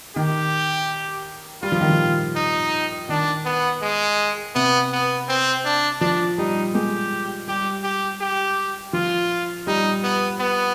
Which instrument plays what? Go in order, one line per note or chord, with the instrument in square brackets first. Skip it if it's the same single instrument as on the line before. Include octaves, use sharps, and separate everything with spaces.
[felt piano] D#3 [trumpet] G4
[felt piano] G3 [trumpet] F4
[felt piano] F3
D#3
F3
[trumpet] D#4
[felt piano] D#3 [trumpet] D4
[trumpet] B3
G#3
[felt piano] C3 [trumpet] B3
[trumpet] B3
C4
D4
[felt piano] F3 [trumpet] D4
[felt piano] G3 [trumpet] D#4
[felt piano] G#3 [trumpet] G4
[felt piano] G3 [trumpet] G4
[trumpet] G4
G4
[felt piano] F3 [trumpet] F4
[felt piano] G3 [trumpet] D#4
[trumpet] B3
B3